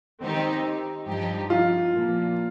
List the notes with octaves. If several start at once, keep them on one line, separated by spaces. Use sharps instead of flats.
D#3 C4 D#4 G4
G2 F3 D#4 G4
F4
A#2 F3 A#3